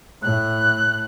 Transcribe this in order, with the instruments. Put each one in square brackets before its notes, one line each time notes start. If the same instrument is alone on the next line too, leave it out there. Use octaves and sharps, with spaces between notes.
[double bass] A2 [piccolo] F#6